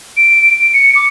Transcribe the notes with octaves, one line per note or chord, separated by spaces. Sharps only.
D7
C#7
D6